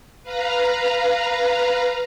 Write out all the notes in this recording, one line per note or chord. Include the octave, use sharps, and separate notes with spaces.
B4 F5 A#5